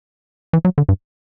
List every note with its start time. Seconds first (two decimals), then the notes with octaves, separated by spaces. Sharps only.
0.53 E3
0.65 F#3
0.78 D3
0.89 G2